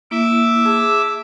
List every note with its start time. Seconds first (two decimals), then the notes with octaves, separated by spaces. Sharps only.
0.11 A#3 E4 E5 D6
0.65 G#4 A5 E6